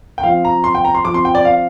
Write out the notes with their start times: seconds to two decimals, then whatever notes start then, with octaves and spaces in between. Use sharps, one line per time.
0.18 G5
0.23 F3 C4 F5
0.45 A#5
0.64 C6
0.75 G5
0.85 A#5
0.95 C6
1.05 F3 C4 D6
1.14 C6
1.25 G5
1.35 D5
1.45 F5